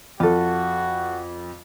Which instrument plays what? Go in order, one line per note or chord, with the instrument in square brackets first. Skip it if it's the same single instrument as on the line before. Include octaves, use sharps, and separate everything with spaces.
[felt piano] F2 [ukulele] F4 A4 [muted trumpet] F#4